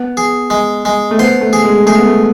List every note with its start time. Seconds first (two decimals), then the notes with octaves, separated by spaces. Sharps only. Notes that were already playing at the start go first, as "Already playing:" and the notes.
Already playing: B3
0.17 G#4
0.50 G#3
0.85 G#3
1.11 A3
1.18 B3 C5
1.41 A3
1.53 G#4
1.64 G#3
1.86 A3 G#4
1.97 B3
2.07 A3